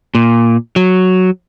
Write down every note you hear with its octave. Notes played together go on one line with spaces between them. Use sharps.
A#2
F#3